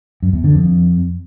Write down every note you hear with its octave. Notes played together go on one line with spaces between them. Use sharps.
F#2
E2
D3
F2